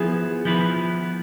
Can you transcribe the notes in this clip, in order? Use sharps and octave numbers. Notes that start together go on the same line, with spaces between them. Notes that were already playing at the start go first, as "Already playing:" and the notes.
Already playing: F3 B3 E4 G#4 B4
F3 B3 E4 B4